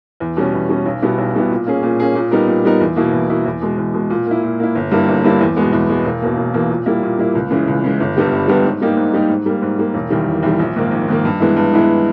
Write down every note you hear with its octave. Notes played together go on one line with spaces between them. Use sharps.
E2
B2 G3 C#4
E2
B2 G3 C#4
B1
B2 G3 B3 E4
B1
B2 G3 B3 E4
A#2
A#3 C#4 G#4
A#2
A#3 C#4 G#4
A#2
G3 B3 D#4 A#4
A#2
G3 B3 D#4 A#4
E2
B2 A#3 E4
E2
B2 A#3 E4
E2
B2 G#3
E2
B2 G#3
A#2
A#3 E4
A#2
A#3 E4
G1
G2 G3 A#3 E4
G1
G2 G3 A#3 E4
E2
B2 G#3 B3
E2
B2 G#3 B3
E1
E2 B2 A#3
E1
E2 B2 A#3
A#2
G3 A#3 E4
A#2
G3 A#3 E4
C#2
C#3 E3 G#3
C#2
C#3 E3 G#3
G1
G2 G3 B3 G4
G1
G2 G3 B3 G4
G#2
G3 A#3 D#4 G4
G#2
G3 A#3 D#4 G4
G#2
G3 A#3
G#2
G3 A#3
E1
E2 D#3 G3
E1
E2 D#3 G3
A#1
G#2 D#3 A#3
A#1
G#2 D#3 A#3
G2
E3 G#3 B3 E4
G2
E3 G#3 B3 E4